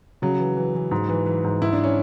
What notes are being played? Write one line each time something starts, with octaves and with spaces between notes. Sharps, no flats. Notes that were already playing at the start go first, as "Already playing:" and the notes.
C#3 F#3
E3
E3
E3
G#2
E3
E3
G#2
G#2 E4
D4
C#4